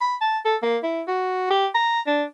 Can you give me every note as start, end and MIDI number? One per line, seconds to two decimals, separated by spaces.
0.01 0.16 83
0.21 0.38 81
0.45 0.56 69
0.63 0.77 58
0.83 1.02 64
1.08 1.47 66
1.50 1.67 67
1.75 2.01 82
2.07 2.24 62